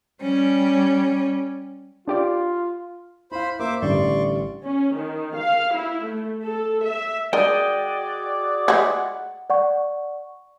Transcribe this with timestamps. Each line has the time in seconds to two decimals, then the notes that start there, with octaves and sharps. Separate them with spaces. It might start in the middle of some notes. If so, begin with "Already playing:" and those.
0.22 G3 C#4
2.08 D4 F4 G4 D5
3.32 E4 C5 F5 B5
3.60 A#3 C5 E5 D6
3.82 A1 D3 G3 D5 C6 C#6
4.65 C#4
4.97 D#3
5.37 F5
5.76 E4
6.07 A3
6.43 A4
6.85 E5
7.33 G#3 D4 F#4 G#4 A#4 D5 D#5 G5
8.68 G#3 E4 F#5
9.50 D5 F#5 C#6